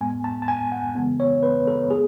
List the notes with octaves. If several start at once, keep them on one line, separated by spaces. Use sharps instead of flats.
A2 G#3 B3 G#5
A5
A5
G#5
F#5
C#3 E3 G#3 B3
C#5
B4
A4
G#3 B3 G#4